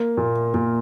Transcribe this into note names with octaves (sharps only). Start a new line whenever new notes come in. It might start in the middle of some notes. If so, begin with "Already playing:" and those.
Already playing: A#3
A#2
A#2